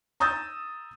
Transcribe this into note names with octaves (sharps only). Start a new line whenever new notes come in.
A#5 D#6 E6 G6 A6